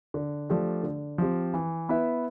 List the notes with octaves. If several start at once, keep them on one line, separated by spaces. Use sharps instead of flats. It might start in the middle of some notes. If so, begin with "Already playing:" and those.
D3
F3 A3 D4 G4
D3
F3 C4 G4
E3
B3 E4 B4 E5